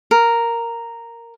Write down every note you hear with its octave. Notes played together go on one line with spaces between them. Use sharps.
A#4